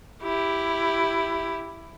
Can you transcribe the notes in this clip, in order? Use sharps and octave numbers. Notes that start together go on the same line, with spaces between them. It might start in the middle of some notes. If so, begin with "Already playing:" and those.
E4 G4